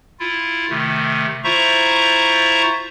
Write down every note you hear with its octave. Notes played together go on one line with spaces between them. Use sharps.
E4 F4
C3 D#3 A3
E4 F4 C5 E5 A#5 C#6